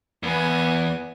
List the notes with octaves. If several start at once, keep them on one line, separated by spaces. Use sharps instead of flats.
E2 B3 G#5